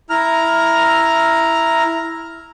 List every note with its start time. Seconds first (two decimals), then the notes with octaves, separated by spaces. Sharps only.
0.10 E4 A#5 F6